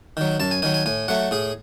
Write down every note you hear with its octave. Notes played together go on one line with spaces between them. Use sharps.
D#3 F#3
F#2 A5
G#5
D#3 F#3 G#5
G#5
A2 G#5
F#3 A3 F#5
A2 G#4